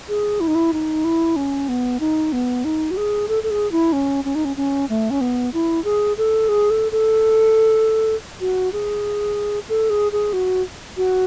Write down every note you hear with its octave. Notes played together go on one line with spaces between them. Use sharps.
G#4
E4
D#4
E4
D#4
E4
C#4
B3
D#4
B3
D#4
F#4
G#4
A4
A4
G#4
E4
C#4
C#4
D#4
C#4
C#4
A3
C#4
B3
E4
G#4
A4
G#4
A4
A4
F#4
G#4
A4
G#4
G#4
F#4
F#4